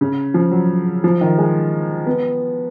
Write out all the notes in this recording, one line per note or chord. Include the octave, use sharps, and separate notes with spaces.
C#3
F3
F#3
F3
D#3
G#3
B3